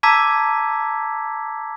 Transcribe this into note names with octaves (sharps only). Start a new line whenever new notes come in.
A5 A#5 D6 E6 G#6 B6